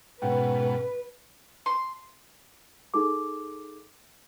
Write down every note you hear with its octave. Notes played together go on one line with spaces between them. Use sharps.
G#2 B2 C#4 B4 F#5 G5
C6
D#4 G#4 A4 D6